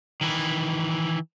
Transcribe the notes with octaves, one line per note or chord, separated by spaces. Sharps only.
D#3 E3